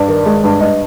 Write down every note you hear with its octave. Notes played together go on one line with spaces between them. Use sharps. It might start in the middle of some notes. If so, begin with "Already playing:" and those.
Already playing: G2 D5
D#3
G#3
G2
G2 D#5